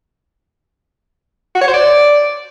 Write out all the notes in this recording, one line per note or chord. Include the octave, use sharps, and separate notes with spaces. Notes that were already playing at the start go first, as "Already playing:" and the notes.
F#4
C#5
C5
D5